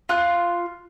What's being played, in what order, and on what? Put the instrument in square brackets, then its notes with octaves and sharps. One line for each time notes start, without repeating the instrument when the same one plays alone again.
[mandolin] F4 F#6